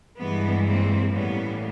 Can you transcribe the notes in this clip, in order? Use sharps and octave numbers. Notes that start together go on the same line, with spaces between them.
G2 E3 G#3 B3
A#3 C4
A2 E3 G3 A#3 B3 C#4